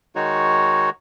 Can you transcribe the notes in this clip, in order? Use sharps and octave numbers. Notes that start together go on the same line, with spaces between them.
D#3 G#3 D#4 F#4 C#5